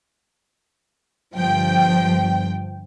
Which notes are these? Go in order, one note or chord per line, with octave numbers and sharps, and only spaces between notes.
G1 G2 F3 G5